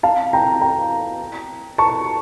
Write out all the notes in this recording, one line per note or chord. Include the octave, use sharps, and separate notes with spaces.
F5 A5
G5 A#5
G5 A#5
A5 C#6